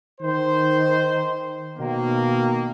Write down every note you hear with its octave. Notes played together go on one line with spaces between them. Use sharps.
D#3 C5
B2 D#3 A#3